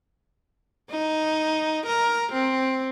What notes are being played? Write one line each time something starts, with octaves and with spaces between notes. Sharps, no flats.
D#4
A#4
C4